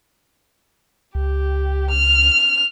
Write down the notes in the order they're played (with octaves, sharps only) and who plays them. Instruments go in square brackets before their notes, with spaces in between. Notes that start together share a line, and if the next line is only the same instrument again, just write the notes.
[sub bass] C#2 [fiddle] G4
[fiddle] F6